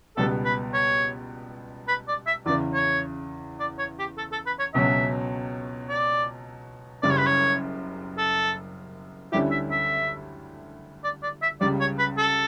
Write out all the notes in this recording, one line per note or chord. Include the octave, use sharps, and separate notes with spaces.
C#2 B2 G3 B3 A4
B4
C#5
B4
D5
E5
E2 C#3 E3 D5
C#5
D5
C#5
G4
A4
A4
B4
C#5
C#2 B2 F#3 C#4 E5
D5
F#1 F#2 C#3 G3 D5
C#5
B4
C#5
A4
D2 D3 G3 C#4 E4 G4
E5
E5
D5
D5
E5
C#2 C#3 G3 D5
C#5
B4
A4